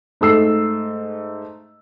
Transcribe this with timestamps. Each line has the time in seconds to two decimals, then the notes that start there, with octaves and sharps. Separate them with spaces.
0.21 G#2 A3 E6 C7